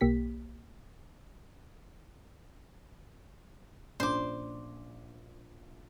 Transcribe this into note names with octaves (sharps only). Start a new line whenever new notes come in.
B1 A#3 G4 B6
A#1 C#4 D4 C5 D5 C6 D6